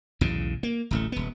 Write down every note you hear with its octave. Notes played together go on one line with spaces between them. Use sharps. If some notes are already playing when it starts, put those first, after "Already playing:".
B1 E2 A2 C#3
A#3
D1 A1 A3
D#1 B3